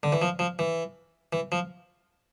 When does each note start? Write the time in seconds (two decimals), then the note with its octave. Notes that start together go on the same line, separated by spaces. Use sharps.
0.03 D3
0.12 E3
0.22 F3
0.39 F3
0.59 E3
1.33 E3
1.52 F3